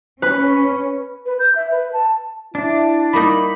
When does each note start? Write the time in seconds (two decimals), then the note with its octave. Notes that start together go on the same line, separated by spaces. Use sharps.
0.22 C#4 B4 B5
1.26 B4
1.39 G6
1.55 E5
1.71 B4
1.93 A5
2.55 D4 E4
3.13 G3 A#3 D#4 B5